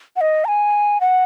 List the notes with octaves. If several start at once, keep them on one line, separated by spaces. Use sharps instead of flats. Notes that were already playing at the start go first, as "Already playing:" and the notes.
F#5
D#5
A#5
G#5
F#5